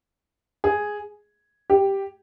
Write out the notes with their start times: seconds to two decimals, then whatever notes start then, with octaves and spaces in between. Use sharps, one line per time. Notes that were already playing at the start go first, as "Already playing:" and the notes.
0.64 G#4
1.70 G4